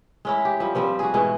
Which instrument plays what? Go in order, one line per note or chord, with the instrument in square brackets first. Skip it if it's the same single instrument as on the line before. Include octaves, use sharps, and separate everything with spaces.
[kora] G#3 C#4 E4
G4
F3 G3
G2 F3 G3 C4
F#4 G#4
G#2 B2 E3 G#3